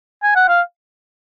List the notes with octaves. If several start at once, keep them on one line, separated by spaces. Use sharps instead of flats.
G#5
F#5
F5